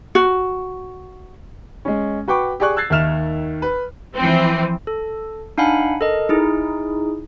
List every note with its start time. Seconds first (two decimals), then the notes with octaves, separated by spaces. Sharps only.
0.15 F#4
1.85 G#3 C#4
2.28 F#4 B4 G5 C#6 D6
2.60 G4 G#4 D5 C#6 F#6
2.77 E6 F#6 G#6 A6 C7
2.90 D#2 D#3 E5 F6 E7 F7
3.62 B4
4.16 E3 F3 C4
4.87 A4
5.58 D4 D#4 F5 F#5 G#5 B5
6.01 A4 A#4 D#5
6.29 D#4 E4 G#4